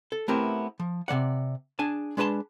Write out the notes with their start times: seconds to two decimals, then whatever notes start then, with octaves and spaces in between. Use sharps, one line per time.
0.12 A4
0.28 A3 B3 C4 E4 G4 A#4
0.80 F3
1.08 C3 F3 D5 F#5
1.79 D4 G#4 G#5 A5
2.17 G#3 D4 B4 G5 A5 C6